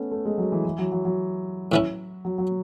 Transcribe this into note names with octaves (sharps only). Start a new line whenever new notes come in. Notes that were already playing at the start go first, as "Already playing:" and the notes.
Already playing: A3 B3 C#4
A3
G#3
F#3
E3
E3
F#3
F#3
F#3
A2 E3 A3 C#4 E4
F#3
F#3